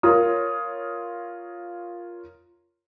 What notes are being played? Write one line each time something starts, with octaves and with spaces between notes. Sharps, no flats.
F4 A#4 C#5 D#6